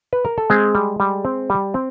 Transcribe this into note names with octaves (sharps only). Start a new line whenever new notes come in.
B4
A#4
A4
G#3 C4 G#4
G3
G3
C4
G3
C4